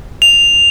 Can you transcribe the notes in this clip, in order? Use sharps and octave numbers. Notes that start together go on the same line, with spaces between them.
F7